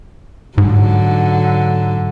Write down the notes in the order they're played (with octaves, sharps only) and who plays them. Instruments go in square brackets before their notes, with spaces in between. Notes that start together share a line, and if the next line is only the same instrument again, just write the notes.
[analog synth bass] G#2 [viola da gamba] D3 F#3